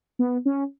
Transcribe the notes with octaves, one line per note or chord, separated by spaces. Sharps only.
B3
C#4